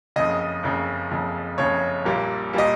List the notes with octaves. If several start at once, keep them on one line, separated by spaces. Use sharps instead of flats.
F#1 F2 C#3 D#5
F#1 F2 C#3
F#1 F2 C#3
F#1 F2 C#3 C#5
A#1 A#2 G3 A#3
A#2 G3 A#3 D#5